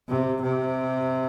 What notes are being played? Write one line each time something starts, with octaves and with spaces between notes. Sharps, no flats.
C3
C3